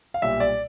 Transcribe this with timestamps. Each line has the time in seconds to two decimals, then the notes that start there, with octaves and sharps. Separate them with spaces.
0.14 F5
0.22 B1 A#2 G3 E5
0.40 D5